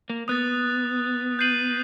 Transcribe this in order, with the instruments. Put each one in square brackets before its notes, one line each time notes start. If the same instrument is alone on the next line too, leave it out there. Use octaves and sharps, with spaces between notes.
[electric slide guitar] A#3
[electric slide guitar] B3 [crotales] D#6 F#6 A6
[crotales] G6 C7 D#7 F#7